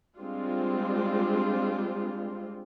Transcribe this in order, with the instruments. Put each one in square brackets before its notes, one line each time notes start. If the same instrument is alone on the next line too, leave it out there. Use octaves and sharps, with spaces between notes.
[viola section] G3 G#3 C4 D4 F4